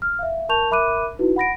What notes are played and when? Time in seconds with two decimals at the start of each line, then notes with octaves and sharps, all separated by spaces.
0.02 F6
0.19 E5 F5
0.49 A#4 A5 C#6 G6 F7
0.71 A#4 E5 B5 D6 F#6 D#7
1.19 D#4 E4 F#4 B4
1.36 F#5 B5 A#6 D7